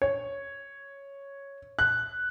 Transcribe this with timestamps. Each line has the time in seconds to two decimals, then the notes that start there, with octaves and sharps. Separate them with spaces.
0.02 C#5
1.79 F#6